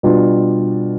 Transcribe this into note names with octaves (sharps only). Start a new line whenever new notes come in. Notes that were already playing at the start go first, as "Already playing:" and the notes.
B2 G3 D4 F4